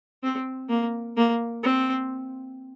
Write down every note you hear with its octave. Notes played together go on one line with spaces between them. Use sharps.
C4
A#3
A#3
C4